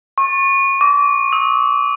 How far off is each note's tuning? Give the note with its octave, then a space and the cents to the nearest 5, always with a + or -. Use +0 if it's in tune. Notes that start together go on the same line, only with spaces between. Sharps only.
C#6 -30
D6 -40
D#6 +45